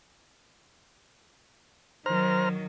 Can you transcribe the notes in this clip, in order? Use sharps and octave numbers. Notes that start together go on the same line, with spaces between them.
D#3 F#3 C5 A#5 F6